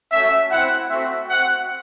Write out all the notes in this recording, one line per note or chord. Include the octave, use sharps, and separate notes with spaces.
A3 C#4 F#4 E5
C4 E4 F#5
A3 C4 F#4 E5
C4 F#4 F#5